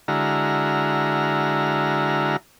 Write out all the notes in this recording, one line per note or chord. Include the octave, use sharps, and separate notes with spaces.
D3 G#3 E4 F#4 A#5 F6